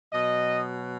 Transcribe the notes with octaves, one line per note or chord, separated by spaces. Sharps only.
B2 F#3 D#5